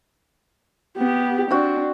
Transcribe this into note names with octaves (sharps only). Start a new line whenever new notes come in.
B3 G4
C4 D4 F#4